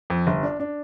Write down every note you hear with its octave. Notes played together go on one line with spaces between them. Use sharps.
F2
G1
D4
D4